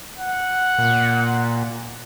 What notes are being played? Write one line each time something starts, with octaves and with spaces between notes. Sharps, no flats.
F#5
A#2